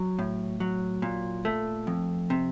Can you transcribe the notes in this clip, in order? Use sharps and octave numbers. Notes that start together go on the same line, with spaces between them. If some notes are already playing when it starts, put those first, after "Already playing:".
Already playing: F#3
A2
F#3
A#2
A3
F2
C3